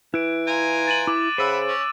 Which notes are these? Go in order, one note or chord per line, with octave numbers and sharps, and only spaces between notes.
E3 E4 F#6 D7
F4 G#5 A#5
A6 D#7 F#7
E4 D6 F#7
C#3 B4 C5 E5 F#5 E6 D#7
C#4